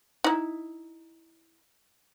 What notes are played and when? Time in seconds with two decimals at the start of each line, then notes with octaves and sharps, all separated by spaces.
0.24 D#4 E4